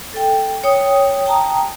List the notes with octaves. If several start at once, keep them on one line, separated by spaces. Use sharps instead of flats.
A4 G5
C#5 G5 D#6
G5 A5 A#5 D#6